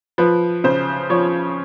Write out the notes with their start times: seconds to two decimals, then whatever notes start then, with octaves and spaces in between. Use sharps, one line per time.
0.18 F3 B4
0.64 C#3 C5
1.10 F3 C#5